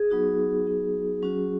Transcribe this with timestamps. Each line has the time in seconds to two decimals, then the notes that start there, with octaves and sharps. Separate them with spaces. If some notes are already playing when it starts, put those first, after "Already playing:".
Already playing: G#4
0.10 F#3 B3 D#4 F#4
0.66 F#3 B3 D#4 F#4
1.22 F#3 C#4 F#4